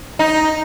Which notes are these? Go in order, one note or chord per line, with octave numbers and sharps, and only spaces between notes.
D#4